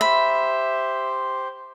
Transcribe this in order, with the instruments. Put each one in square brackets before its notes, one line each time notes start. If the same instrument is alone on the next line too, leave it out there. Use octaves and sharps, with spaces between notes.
[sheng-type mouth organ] G4 C5 [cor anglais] E5 [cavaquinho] B5